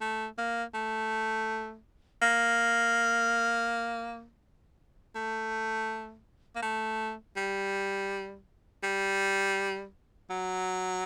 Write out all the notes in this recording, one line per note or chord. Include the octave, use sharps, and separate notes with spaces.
A3
A#3
A3
A#3
A3
A#3
A3
G3
G3
F#3